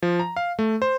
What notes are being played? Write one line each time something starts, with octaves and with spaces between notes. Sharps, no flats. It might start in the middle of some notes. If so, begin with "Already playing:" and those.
F3
A#5
F5
A3
C5